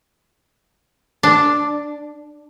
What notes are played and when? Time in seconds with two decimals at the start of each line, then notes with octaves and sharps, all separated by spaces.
1.23 D4